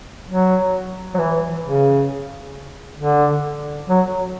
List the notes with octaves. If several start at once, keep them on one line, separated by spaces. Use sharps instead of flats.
F#3
F#3
E3
C#3
D3
F#3